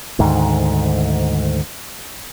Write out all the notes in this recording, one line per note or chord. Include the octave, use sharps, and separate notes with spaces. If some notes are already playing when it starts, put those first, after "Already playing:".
D2 G#2 D#3